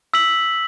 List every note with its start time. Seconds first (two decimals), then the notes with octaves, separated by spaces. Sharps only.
0.14 E6 B6 F#7